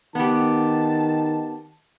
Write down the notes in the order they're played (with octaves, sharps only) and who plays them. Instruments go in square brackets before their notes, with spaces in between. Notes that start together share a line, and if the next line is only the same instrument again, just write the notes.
[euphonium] D#3 [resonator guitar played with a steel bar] B3 G4 [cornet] A5